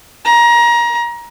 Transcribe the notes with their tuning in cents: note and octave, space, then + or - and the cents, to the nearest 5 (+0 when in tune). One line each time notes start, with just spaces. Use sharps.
A#5 +25